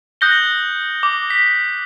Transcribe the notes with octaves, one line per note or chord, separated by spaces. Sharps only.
D#6 F#6 G6 A#6 C#7 G7
D6
B6